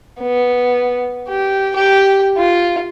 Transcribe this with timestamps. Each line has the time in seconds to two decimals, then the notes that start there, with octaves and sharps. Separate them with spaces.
0.20 B3
1.28 G4
1.76 G4
2.38 F4